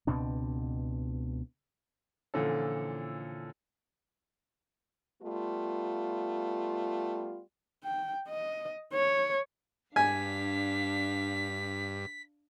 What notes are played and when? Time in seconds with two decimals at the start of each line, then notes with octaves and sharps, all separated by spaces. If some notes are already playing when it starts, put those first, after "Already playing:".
0.07 C#2 B2 C4 D4
2.34 A#2 D3 E3 F3 C#4 A4
5.23 G3 A3 B3 F4
7.84 G5
8.28 D#5
8.93 C#5
9.96 G2 D4 F5 G#5 B6